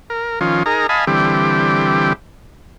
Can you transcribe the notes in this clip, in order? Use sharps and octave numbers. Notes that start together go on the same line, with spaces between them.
A#4
D#3 F3 C#4 F4
D#4 G#4 A#4 A#5
D#5 F5 G#5 A5 B5
D3 E3 G3 C4 G4